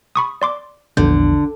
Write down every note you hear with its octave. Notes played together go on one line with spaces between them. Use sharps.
B5 C#6 D#6
D5 C6 D6
A#1 E2 D3 G6